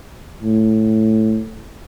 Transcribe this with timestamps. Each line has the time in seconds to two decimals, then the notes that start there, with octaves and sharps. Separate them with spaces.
0.43 A2